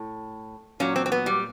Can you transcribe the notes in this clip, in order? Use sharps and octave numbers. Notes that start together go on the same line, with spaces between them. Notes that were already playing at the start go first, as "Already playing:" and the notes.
Already playing: A2
A#2 F#3 C#4
C4
C4
B3
G3